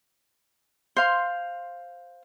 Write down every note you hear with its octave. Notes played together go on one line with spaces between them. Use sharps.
C5 F5 C6